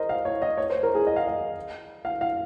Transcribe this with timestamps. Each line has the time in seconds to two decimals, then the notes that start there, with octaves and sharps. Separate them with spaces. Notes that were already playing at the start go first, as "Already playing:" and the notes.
Already playing: A#4 C5 D#5
0.09 F5
0.25 C#5
0.42 D#5
0.57 C#5
0.70 C5
0.83 A#4
0.95 G#4
1.07 D#5
1.16 F5
1.27 D#5
2.05 F5
2.21 F5